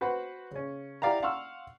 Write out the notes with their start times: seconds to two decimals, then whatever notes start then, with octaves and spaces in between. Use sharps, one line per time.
0.01 F#4 B4 C5 F#5 B5
0.51 C#3 C#4
1.02 E4 G4 D5 F5 F#5 A#5
1.23 F5 F#5 C6 C#6 E6 F6